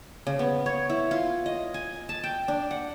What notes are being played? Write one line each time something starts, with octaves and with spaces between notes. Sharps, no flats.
C#3
B3
C#5
E4
F4
D#5
G#5
A5
G5
D4
F#5